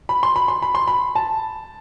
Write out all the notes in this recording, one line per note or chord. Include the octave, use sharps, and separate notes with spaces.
B5
C6
B5
C6
B5
C6
B5
A5